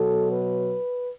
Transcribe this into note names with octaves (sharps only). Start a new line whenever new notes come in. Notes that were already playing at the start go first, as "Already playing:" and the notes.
Already playing: B2 F#3 A4
B4